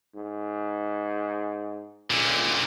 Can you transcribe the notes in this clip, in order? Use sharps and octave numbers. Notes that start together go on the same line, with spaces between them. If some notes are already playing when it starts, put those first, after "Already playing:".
G#2
C#2 A#2 D3